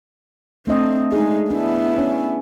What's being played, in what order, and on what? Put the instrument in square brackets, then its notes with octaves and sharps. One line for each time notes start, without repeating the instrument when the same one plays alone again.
[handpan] A3 D4 D#5 [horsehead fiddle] C4
[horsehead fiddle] G#3 D#4 [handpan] G#4
[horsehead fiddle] B3 E4 [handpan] D4
[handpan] C#4